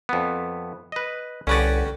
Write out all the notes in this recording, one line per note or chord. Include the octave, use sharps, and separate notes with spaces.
F2 B3
B4 D#5
C2 D3 C#4 F#4 G4 B4 D5